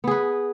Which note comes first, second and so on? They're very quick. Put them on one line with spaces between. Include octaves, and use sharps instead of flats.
B3 G#4 B4